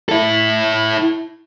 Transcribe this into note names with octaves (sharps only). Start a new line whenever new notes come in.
E4 A4